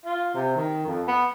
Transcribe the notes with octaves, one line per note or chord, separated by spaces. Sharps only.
F4
C3
D#3
F2
B3